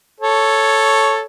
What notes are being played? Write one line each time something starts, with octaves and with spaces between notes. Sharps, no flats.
A4 C#5